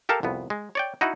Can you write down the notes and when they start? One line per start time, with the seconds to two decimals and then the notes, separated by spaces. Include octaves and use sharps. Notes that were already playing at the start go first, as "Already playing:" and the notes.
0.09 G4 A4 A#4 F5 A5
0.23 C2 F2 B3
0.50 G#3
0.75 C#5 D5 G5
1.01 D#4 E4 F#4 F#5